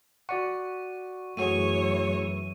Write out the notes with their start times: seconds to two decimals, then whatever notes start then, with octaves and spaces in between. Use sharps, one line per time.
0.29 F#4 D5 F#5 C#6
1.37 F#2 E3 A3 F#4 G#4 C#5 D#7